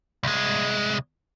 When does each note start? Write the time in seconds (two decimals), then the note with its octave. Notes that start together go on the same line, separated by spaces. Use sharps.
0.23 C2 G#3